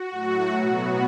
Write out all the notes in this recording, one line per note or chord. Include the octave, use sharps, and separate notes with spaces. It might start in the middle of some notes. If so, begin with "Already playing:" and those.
Already playing: F#4
A2 F#3 A3
B2 F#3 B3 F#4